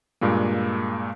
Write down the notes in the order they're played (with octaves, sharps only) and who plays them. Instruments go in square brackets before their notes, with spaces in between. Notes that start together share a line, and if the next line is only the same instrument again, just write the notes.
[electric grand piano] G2 A#2 G#3 A#3